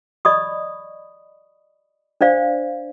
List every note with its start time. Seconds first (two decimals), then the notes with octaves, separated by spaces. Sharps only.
0.25 D5 D#5 B5 C#6 D#6
2.21 D4 C5 D5 F5